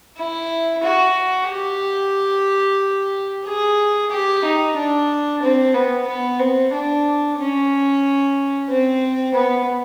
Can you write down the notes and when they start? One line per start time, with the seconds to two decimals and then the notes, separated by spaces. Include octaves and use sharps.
0.17 E4
0.84 F#4
1.48 G4
3.45 G#4
4.11 G4
4.44 D#4
4.76 D4
5.42 C4
5.75 B3
6.07 B3
6.40 C4
6.73 D4
7.38 C#4
8.69 C4
9.35 B3